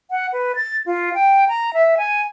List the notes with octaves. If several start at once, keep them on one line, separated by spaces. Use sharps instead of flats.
F#5
B4
A6
F4
G5
A#5
E5
G#5